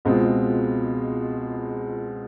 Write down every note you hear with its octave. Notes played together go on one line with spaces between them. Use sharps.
C#2 B2 G#3 C4 F4